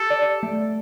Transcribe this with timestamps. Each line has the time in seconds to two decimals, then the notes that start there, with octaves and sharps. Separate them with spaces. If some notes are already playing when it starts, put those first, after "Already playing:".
Already playing: G4 A4
0.10 D5
0.43 A3